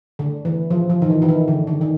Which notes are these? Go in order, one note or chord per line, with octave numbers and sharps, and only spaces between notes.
D3
E3
F3
F3
D#3
E3
E3
D#3
D3
D3
D#3